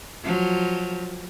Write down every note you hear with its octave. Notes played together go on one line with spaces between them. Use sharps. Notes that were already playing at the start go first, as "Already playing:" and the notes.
F3 F#3